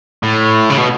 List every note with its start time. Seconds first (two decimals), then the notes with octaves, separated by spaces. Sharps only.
0.23 A2
0.70 C#3
0.78 B2